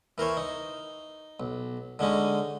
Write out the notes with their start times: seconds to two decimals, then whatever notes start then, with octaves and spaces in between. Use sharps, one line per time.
0.18 E3 A#4 C5 C#5
0.37 D#4
1.40 B1
1.99 D3 G#3 C#4 D#4